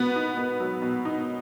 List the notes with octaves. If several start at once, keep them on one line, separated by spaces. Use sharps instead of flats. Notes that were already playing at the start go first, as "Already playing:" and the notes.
Already playing: B2 B3 B4
D#4
B3
F#3
B2
D#4